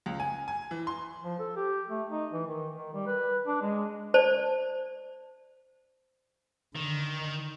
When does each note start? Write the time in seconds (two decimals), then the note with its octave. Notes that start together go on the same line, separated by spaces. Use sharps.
0.06 C#2
0.20 G#5
0.48 G#5
0.71 E3
0.87 C6
1.22 F3
1.39 A4
1.56 G4
1.88 A3
2.11 D#4
2.33 E3
2.47 D#3
2.76 D#3
2.93 G3
3.07 B4
3.47 D4
3.61 G#3
4.14 C5 D5 A5
6.75 D3 D#3